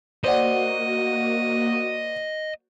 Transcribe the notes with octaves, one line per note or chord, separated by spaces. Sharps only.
A#3 F#4 C5 D5 D#5 F#5